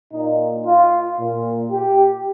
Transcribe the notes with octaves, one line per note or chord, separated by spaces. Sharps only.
A#2 D#4
F4
A#2
G4